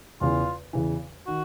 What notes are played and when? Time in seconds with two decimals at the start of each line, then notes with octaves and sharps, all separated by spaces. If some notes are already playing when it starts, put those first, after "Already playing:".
0.21 E2 C#3 E3 F4
0.73 E2 C#3 E3
1.27 D#3 F#4